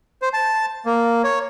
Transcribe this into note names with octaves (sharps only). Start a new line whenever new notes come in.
C5
A5
A#3
C#5